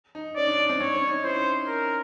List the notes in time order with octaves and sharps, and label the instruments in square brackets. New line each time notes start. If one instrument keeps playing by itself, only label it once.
[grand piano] D#4
[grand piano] C#4 [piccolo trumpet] D5
[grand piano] D4
D4
C4
[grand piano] C4 [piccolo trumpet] C#5
[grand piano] C#4
D#4
[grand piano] E4 [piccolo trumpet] C5
[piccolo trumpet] A#4